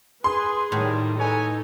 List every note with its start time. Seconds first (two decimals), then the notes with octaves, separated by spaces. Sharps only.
0.24 G#4 B4 C6
0.72 A2 D#3 G3
1.19 D#4 A4 B4 C#5 G#5